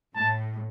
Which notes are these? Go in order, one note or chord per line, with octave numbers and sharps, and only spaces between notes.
A2 A5